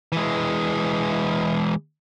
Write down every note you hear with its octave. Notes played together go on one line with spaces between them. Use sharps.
E3 G#3